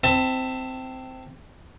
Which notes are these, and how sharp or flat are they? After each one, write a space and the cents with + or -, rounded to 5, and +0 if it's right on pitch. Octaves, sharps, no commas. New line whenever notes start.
C4 -10 E4 +0 A5 +20